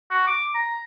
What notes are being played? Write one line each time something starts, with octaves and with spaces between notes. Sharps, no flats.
F#4
D6
A#5